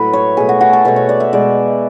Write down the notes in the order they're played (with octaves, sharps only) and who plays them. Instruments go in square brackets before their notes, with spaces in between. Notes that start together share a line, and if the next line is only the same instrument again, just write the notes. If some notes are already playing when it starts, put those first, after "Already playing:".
Already playing: [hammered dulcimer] A2 F#3 A3 B4
C#5
B2 A3 G#4
F#4
F#4
A4
B2 A3 C#5
C#5
D5
E5
B2 G#3 B3 D5